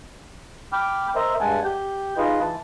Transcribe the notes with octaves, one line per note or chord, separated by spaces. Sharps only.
G5 B5 D6 F6
A#4 C5 D#5 E5 A#5
G2 G#3 F#5 G#5 A5
G4 G6
D#4 F4 G#4 B4 D#5
E3 A5